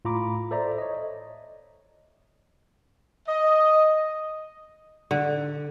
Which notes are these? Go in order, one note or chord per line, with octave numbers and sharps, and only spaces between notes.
A2 F4 A#5 B5 D6
A4 C5 D5 E5 A#5
C#5 D#5
D#5
D3